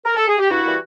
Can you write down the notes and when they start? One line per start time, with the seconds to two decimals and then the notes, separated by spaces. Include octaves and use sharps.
0.05 A#4
0.16 A4
0.27 G#4
0.38 G4
0.50 G2 E4 F#4
0.64 E3 G3 A#3